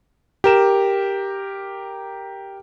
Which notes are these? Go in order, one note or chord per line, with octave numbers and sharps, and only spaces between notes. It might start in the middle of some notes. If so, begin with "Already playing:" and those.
G4 A#4 E7